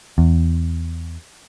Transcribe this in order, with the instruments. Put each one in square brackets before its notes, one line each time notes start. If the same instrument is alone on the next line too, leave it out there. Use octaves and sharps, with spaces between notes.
[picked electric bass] E2